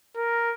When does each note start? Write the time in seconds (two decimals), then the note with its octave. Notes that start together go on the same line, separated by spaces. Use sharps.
0.16 A#4